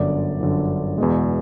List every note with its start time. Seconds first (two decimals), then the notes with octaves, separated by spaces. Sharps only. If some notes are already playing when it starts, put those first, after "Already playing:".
Already playing: G1 F#2 D3 D5
0.40 G1 F#2 D3
0.98 E2 B2 G#3